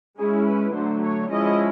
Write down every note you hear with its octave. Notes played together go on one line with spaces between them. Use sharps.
G#3 C#4 E4 G#4
B4
D3 F#3 A3 C5
C#5
F3 G#3 C#4 E4 D#5